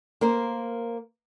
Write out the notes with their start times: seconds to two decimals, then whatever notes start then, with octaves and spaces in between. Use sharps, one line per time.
0.21 A#3 A#4 C5